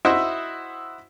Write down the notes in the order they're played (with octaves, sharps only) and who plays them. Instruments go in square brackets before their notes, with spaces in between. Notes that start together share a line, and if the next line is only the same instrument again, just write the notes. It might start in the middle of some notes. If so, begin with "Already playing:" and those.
[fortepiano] E4 F#4 C5 D#5 E5